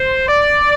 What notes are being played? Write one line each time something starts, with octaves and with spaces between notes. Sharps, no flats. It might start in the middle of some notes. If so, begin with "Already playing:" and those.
Already playing: C5
D5